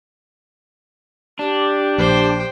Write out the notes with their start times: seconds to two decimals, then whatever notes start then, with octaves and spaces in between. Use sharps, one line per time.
1.39 D4 G4
1.98 A#1 C5 G5